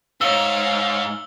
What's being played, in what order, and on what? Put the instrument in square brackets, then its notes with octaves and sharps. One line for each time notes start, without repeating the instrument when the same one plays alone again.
[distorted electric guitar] G#2 [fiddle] C#5 [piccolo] F5 [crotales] E6 G7